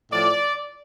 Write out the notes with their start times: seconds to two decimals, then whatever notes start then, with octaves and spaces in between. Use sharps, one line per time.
0.12 A2 F3 D5